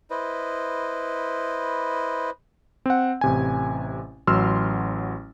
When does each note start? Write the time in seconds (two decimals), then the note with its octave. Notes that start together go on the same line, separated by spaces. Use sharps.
0.10 E4 B4 C5 D#5
2.86 C4 F#5
3.21 A1 C3 G#5
4.27 A1 F#3 C6 E6 F6